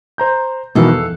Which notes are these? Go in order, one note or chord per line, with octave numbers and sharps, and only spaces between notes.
C5 A#5 G6
E2 B2 D#3 E3 A4 F5
F#6